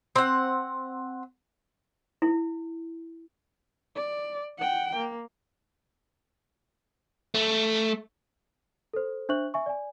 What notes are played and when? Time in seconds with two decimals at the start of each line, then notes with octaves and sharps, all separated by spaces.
0.16 C4 F#5
2.22 E4
3.96 D5
4.58 F#5 G5
4.96 A#3
7.35 A3
8.93 A4 C5
9.29 D4 C5 E5 C#6 F#6 F#7
9.54 E5 G#5 C#6
9.66 D5 G#5